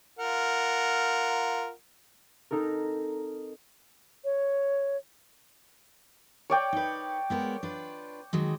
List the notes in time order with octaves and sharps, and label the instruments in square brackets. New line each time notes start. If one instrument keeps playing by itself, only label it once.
[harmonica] F4 A#4 F#5
[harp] C4 D#4 A4 A#4
[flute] C#5
[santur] C#5 D5 G5
[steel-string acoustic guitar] D#4 B4
G#3 B3 A#4
D4 F4 B4
D#3 F#3 G#3